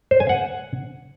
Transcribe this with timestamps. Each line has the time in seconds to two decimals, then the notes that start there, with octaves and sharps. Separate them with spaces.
0.11 C5
0.20 G#5
0.29 F#5